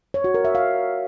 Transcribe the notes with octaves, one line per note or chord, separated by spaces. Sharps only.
C#5
F#4
A#4
E5
F5